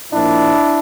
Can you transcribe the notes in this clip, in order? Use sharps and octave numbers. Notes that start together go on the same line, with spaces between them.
A#2 F3 A#3 D4 E4